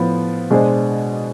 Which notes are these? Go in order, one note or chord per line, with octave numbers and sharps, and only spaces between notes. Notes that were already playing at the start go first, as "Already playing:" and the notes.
Already playing: A2 F3 B3
B2 G#3 D4 G#4 C5